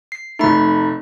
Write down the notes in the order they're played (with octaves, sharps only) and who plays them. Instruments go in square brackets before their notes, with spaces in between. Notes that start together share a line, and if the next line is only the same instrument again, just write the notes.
[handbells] C7
[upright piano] F1 A3 [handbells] D#4 B5